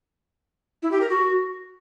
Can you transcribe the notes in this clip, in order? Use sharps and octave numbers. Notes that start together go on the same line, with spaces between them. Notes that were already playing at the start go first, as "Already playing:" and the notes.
E4
G4
A#4
F#4